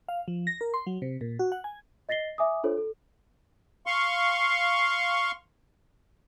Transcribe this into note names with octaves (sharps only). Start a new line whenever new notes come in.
F5
F3
A#6
A#4
C6
F#3
C3
A#2
F#4
F#5
G#5
D#5 A6 A#6 C7 G7
E5 G#5 D6 D#6
D4 F4 A4 C5 C#5
A4
F5 C6 C#6